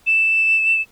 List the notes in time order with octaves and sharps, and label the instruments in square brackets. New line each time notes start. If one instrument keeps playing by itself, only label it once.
[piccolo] E7